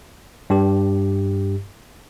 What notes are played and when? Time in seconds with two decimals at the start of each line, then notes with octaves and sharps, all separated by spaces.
0.50 G2 G4